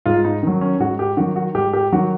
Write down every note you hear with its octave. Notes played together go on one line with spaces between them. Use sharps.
G#2 F4
D#4
D#3 F#3
C#4
G#2 F#4
G4
D#3 F#3 F#4
F#4
G#2 G4
G4
D#3 F#3 F#4